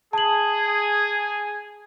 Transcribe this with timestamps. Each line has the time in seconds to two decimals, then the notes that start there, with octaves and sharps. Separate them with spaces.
0.13 G#4 A5 F#7